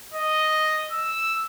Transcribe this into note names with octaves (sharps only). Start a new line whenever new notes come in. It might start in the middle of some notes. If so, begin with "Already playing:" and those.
D#5
E6